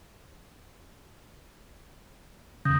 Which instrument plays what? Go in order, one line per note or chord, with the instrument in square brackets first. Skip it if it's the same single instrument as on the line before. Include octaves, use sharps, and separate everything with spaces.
[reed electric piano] E2 C#3 [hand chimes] D#6 G6 A#6